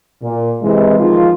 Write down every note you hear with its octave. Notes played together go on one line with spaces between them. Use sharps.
A#2
C3 E3 G#3
D#3 F3 G#3 F4